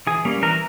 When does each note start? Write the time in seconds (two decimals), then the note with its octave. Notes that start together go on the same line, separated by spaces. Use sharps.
0.07 E3 G#4
0.25 G3 A#3 C#4
0.42 E3 A#4